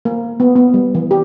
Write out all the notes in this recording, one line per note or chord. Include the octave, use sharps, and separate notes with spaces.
A#3
B3
B3
G3
E3
G4